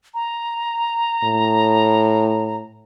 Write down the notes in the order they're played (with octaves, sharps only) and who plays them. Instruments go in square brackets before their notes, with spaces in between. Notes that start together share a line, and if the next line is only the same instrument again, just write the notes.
[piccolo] A#5
[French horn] A2